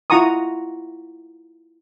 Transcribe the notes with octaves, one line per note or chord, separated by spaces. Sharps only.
E4 F4 F#5 A#5 C#6 D#6